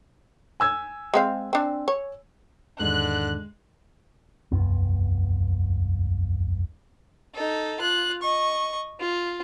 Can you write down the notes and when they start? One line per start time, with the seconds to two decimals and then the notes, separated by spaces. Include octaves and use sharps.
0.60 G#5 E6 G#6
1.14 G#3 C4 F5
1.53 C4 D4
1.88 C#5
2.80 E2 G#2 D3 D#3 G#3 F#6
4.52 E1 C2 F#2 B3
7.35 D#4 A4
7.80 F4 F#6
8.22 D#5 C#6
9.00 F4